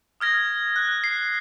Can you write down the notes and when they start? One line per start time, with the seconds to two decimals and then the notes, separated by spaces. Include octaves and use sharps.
0.20 D#6 F6 G#6 A#6
0.76 F#6
1.04 C7